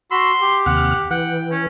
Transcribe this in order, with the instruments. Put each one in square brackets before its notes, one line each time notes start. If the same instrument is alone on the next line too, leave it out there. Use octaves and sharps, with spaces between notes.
[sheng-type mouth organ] F#4 B5 E6 [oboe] C6
[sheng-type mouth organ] G4
[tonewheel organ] D#2 C3 F6 [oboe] F#5
[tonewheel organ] E3 [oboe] F#5 [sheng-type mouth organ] G5
[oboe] C#4